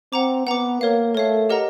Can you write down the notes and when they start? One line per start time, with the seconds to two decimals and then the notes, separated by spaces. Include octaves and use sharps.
0.12 C4 F#5 A#5 D6
0.47 B3 F#5 A#5 D6
0.81 A#3 A#4 C#5 F5
1.15 A3 A#4 C#5 F5
1.50 G4 A#4 D#5 F#5 A#5